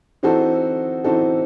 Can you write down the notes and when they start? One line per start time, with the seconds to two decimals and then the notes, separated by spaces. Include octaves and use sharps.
0.23 E3 C4 D#4 F#4 A4
1.04 E3 C4 D#4 F#4 A4